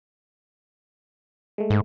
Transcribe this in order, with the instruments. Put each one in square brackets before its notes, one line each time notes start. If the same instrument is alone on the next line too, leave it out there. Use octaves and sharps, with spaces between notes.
[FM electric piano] G#3 A3
[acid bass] G#2